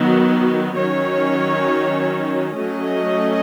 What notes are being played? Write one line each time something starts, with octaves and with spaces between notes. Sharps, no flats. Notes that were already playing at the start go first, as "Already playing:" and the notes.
Already playing: D#3 F#3 B3
D#3 F#3 C#4 C#5
F#3 A3 C#4 D#5